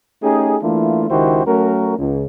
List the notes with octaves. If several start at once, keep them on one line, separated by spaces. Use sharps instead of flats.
A3 C#4 D#4 G4 G#4
E3 A3 A#3 D4 E4 F4
C#2 D#3 E4 F#4 G4 C5
F#3 A3 C#4 F#4 A#4
C#2